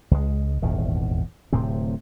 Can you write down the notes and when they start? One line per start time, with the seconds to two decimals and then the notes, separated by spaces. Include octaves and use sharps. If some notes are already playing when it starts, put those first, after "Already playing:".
0.11 C#2 G#3
0.62 D#1 G#1 E2 D#3
1.53 D1 A2 C3 C4